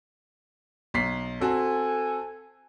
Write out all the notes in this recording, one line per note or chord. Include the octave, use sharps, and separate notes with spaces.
B1 B6 C7
C4 F#4 A4 G#5